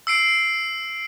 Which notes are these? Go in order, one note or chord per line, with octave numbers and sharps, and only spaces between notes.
E6 C7 D7